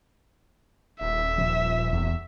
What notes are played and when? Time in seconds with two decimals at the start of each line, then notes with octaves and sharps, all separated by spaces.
1.01 D#1 E5
1.38 A#2 F3
1.93 E2